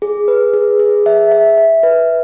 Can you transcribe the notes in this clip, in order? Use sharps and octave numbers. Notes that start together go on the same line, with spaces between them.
G#4
B4
G#4
G#4
E5
E5
E5
B4